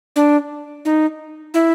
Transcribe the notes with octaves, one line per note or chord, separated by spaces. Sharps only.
D4
D#4
E4